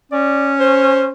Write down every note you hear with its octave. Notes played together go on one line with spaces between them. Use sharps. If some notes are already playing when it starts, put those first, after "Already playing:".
C#4 D5
C5